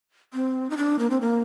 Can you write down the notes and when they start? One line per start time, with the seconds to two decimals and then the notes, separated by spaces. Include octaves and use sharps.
0.34 C4
0.70 D#4
0.77 D4
0.99 A#3
1.10 C4
1.21 A#3